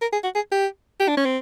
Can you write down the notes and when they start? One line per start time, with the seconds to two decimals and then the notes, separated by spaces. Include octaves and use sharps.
0.02 A#4
0.13 G#4
0.24 F#4
0.35 G#4
0.52 G4
1.00 G4
1.08 D4
1.17 C#4
1.25 C4